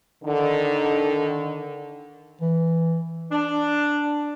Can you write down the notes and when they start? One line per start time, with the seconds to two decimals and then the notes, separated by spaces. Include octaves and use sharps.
0.23 D3 D#3
2.41 E3
3.31 D4